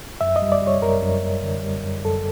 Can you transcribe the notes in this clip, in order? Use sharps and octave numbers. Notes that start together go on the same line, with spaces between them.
F#2 E5
D#5
G3
D5
G3
C#5
F#2 A#4
F#2
F#2
D3
G3
F#2
F#2 A4